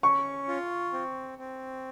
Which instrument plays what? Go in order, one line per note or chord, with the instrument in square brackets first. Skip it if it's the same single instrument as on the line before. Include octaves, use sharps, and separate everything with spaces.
[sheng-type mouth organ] C#4 [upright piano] C#6
[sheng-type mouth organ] F4
C4
C4